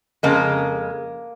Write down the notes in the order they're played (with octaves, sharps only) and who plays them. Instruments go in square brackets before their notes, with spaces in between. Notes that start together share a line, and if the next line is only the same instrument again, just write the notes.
[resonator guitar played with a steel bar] F2 C#3 G#3 A#3